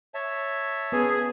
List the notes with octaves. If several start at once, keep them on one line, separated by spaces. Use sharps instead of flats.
C#5 E5 A5
B3 C#4 G#4 B4